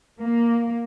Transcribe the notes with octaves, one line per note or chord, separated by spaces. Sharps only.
A#3